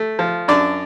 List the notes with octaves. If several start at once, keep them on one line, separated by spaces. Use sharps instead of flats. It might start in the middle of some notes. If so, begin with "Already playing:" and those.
Already playing: A3
F3
F#2 D4 D5